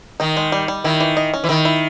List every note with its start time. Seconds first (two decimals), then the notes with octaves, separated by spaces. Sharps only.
0.20 D#3 D#4
0.37 G#3
0.52 G3
0.68 G3
0.84 D#3 E4
1.00 E3
1.17 D#5
1.34 C#4
1.44 E3
1.49 D#3 E4
1.65 E4